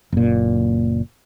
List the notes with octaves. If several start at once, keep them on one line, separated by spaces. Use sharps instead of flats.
F#1 A#2